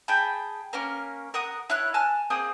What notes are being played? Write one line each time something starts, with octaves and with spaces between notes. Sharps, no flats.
G#4 G5 A5 B5
A#3 C#4 A#4
A#4 F#5 D#6
E4 C#5 F#6
G#5 A5 F6 F#6
A#3 C4 G#4 D#6